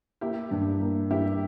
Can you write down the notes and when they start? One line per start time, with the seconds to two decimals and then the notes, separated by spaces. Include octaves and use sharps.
0.21 A#3 E4 G4
0.51 G2
0.81 A#3
1.10 G2 E4 G4